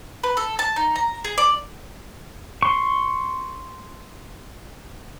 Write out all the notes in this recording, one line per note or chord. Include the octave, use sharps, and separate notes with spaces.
B4
A4
A5
D#4
A#5
G#4
D5
C6 C#6